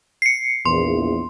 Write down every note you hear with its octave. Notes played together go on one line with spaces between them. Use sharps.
C7 C#7
A#1 E2 C6